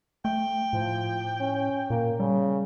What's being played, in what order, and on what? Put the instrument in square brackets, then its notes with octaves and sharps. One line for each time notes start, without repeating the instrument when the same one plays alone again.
[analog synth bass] A3 [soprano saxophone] G5
[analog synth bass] A2 [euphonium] F3
[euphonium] C#4
[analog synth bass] A#2 [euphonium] A#3
[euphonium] C#3 [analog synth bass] G3